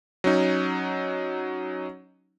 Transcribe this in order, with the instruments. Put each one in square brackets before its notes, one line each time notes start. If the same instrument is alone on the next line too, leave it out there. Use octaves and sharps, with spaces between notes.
[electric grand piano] F#3 C#4 D#4